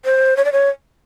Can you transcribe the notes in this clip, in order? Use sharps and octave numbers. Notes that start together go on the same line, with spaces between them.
C5
C#5
D5
C#5